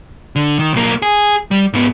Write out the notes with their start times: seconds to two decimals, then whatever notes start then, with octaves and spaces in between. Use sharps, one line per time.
0.36 D3
0.59 D#3
0.73 B1 A#3
1.02 G#4
1.51 G3
1.73 G#2 B3